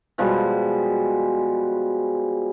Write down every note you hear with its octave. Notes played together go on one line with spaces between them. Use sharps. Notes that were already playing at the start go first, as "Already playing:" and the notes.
B2 F3 G3 G#3